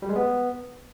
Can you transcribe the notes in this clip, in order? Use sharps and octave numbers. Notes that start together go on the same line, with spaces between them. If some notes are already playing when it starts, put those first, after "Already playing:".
G3
G#3
B3